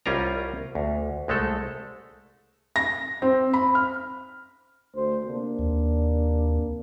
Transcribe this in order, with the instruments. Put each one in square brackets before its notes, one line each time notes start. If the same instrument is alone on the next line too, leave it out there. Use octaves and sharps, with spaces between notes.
[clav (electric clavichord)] C2 G3 C#4 F4 A#4 A#5
D2
C2 G#3 A3 A4
[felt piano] A#6
C4
B5
F6
[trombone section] D2 C5
C3 A#3 D4
[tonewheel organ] D#2